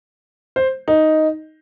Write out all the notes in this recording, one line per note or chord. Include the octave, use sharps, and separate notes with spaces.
C5
D#4